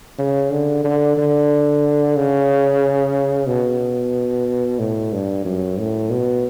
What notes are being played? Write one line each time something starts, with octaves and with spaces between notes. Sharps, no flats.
C#3
D3
D3
D3
C#3
B2
A2
G2
F#2
A2
B2